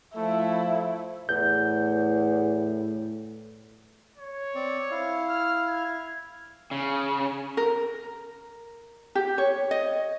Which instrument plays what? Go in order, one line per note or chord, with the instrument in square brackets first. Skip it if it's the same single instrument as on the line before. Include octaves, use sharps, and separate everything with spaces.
[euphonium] F3 [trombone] A3 [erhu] E4
[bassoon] E2 [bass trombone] A2 [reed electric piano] G6
[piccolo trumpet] C#5
[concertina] C4 D5
E4 F5
[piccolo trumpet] F6
G#6
[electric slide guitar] C#3
[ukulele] A#4
G4
C#5
D#5